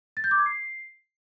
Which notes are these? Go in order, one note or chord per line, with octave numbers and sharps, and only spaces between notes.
A6
G6
D6
G#6
C7